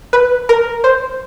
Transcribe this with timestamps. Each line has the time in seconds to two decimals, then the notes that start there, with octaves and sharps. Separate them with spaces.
0.13 B4
0.49 A#4
0.84 C5